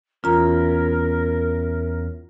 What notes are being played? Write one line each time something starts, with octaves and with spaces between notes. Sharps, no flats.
E2 C#4 F4 A#4 A#5